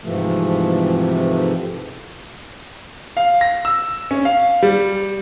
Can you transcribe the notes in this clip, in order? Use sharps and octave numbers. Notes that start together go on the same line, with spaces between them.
G#2 C3 E3 F3 A3
F5
A#6
E6
C#4
F5
G3